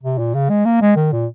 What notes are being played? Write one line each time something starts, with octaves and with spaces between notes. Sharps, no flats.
C3
A#2
C#3
G#3
A#3
G#3
D#3
A#2